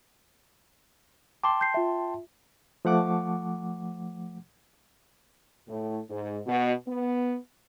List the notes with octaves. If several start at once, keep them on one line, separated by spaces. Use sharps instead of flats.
G5 A5 C6 D6
G6 C7
F4 E5
F3 A3 F#5 D6
A2
G#2
B2
B3